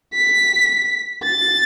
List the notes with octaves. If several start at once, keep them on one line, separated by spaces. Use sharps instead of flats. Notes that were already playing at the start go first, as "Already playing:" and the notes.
B6
A6